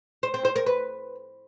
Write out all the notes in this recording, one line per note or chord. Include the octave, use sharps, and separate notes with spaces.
C5
C4
C5
A#4
B4